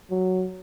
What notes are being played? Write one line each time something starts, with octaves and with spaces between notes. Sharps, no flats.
F#3